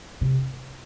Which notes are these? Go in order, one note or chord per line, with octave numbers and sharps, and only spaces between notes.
C3